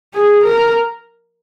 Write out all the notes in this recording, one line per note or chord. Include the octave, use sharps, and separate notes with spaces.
G#4
A#4